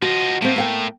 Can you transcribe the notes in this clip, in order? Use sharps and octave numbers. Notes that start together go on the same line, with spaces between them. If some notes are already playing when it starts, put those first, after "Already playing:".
F3 D#4 F#4
A2 A#3 C4
A#3 F5 G5